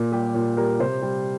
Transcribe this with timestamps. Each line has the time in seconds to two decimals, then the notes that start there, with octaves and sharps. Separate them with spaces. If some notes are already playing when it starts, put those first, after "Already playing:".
Already playing: A#2
0.12 G3 G4
0.34 A#2
0.57 G3 A#4
0.80 C3 C5
1.02 G3